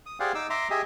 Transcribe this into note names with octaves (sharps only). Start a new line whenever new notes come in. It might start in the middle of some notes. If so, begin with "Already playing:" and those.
D#6
G4 G#4 C5 D5 F5 F#5
D#4 D6 E6
E5 A#5 C6 D6
G4 G#4 D#5 E5